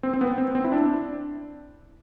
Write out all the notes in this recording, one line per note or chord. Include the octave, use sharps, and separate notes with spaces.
C4
C4
B3
C4
C4
E4
D4